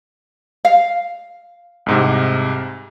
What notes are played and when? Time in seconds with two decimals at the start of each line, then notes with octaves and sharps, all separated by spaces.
0.65 F5
1.86 C2 G#2 C3